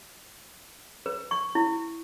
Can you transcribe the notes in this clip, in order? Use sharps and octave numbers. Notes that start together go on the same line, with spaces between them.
B4
C#6
E4